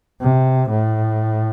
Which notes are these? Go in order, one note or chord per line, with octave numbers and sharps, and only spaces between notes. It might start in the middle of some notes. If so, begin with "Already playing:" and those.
C3
A2